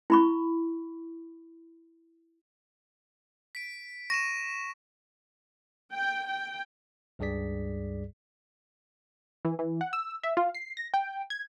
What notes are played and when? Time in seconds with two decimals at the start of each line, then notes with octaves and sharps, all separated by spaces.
0.10 E4 B5 C#6
3.55 B6 D7
4.10 C#6 A#6 D#7 E7
5.93 G5
6.28 G5
7.19 C#2 G2 G3 G#4 D5 B6
9.45 E3
9.59 E3
9.81 F#5
9.93 E6
10.23 E5
10.37 F4
10.55 C7
10.77 A#6
10.94 G5
11.30 G#6